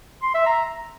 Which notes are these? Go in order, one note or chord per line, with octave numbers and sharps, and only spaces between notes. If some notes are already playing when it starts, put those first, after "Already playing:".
C6
E5
A#5